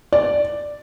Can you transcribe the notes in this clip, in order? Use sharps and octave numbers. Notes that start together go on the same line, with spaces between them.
D5